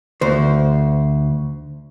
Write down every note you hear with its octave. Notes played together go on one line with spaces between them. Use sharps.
D2 C5